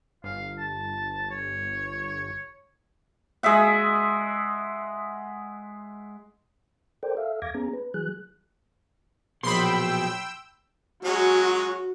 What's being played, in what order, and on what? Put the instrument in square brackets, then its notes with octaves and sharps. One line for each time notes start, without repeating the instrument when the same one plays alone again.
[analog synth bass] G1 [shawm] F5
[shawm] A5
C#5
[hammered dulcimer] G#3 D#5 E5 F#5
[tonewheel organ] A4 A#4 C5 D5 G5
A4 E5 F5
E2 F5 D6 G#6 A#6
B3 C#4 G#4 A#5
B4
E3 F#3 G#4 F#6
[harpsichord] A#1 D#5 [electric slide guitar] B2 F#3 [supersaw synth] G5 E6 [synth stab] B5 C6
[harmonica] F#3 G#3 C#4 [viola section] F#4